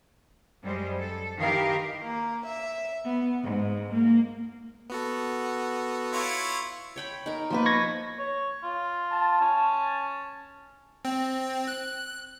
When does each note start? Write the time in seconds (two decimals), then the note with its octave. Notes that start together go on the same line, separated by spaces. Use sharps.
0.64 F#2 G3 G#3 C5
0.99 A4
1.38 D#3 E3 G4 A#4 F5
2.03 A#3
2.46 E5
3.04 B3
3.43 G#2
3.93 A#3
4.90 B3 F#4 A4
6.13 E4 F4 C#5
6.96 C#5 G5 B5
7.26 D#4 A#4
7.50 F3 A#3 B4
7.66 C#6 G#6 A#6
8.19 C#5
8.63 F4
9.12 A5
9.41 C#4
11.05 C4
11.68 F#6